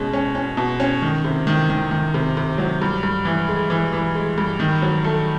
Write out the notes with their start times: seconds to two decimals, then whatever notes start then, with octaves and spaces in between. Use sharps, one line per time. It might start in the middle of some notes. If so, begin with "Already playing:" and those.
Already playing: B2 G#3 C#4
0.13 C#4
0.35 C#4
0.57 B2
0.80 C#4
1.02 D#3
1.24 C3
1.47 D#3
1.70 D#3
1.91 D#3
2.14 C3
2.37 C3
2.58 F#3
2.82 G2
3.03 G2
3.25 E3
3.49 G#3
3.70 E3
3.93 E3
4.15 G#3
4.38 G2
4.60 D#3
4.82 F#3
5.04 A3